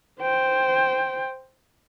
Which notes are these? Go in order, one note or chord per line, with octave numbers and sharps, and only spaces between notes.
C5 G5